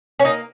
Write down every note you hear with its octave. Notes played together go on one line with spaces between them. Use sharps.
C#4
A#3 D#4